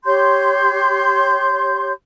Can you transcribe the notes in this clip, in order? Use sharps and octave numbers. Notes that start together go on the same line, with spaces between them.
G4 C#5 C6 G6